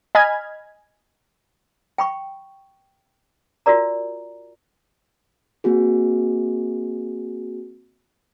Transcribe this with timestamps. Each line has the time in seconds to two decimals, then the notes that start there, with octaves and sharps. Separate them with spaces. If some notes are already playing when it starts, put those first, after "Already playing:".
0.15 D#5 G#5 B5 F6 G#6
1.98 G5 B5 C#6
3.66 F4 F#4 A#4 D5 A#5
5.64 A#3 C4 F#4 G#4